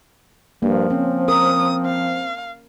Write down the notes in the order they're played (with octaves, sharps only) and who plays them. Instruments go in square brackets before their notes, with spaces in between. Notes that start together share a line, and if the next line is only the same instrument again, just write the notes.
[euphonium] G2 [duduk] F3 [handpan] A#3
[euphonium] C4 [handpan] C#4
[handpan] A#4 [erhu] D#6
[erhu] F5